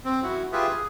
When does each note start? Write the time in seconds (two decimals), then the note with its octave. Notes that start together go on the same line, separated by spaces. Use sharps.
0.05 C4
0.23 F#2 E4 F#4
0.52 F4 G4 G#4 B4 E5
0.71 G#4